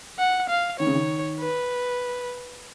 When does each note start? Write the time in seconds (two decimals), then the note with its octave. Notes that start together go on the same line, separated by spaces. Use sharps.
0.19 F#5
0.49 F5
0.79 D#3 C#5
0.86 C#3
0.93 D#3
1.40 B4